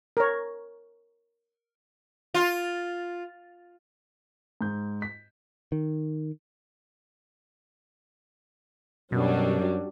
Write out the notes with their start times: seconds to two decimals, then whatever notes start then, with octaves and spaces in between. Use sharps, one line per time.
0.17 A#4 C#5
2.34 F4
4.61 G#2 G6
5.02 B6
5.72 D#3
9.12 F#2 B2 F#3 G3 D4